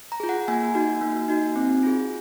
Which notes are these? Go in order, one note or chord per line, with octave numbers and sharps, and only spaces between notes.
A#5
F4 G#4
F#5
A#3 G#5
D#4 F#4
A#3
D#4 F#4
C4
F4 G#4